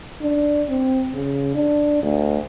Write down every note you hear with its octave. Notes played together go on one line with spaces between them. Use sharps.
D4
C4
C#3
D4
D2